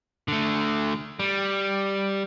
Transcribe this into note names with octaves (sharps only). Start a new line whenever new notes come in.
D3 A3
G3